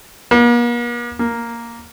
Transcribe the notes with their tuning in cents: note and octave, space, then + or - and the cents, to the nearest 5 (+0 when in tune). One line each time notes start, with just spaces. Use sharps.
A#3 +45
A#3 +0